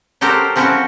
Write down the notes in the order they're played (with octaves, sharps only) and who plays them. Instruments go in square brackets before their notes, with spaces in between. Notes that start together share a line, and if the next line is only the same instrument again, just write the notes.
[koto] F#3 G4 A4 A#4 C5
F3 C4 C#4 E4 F#4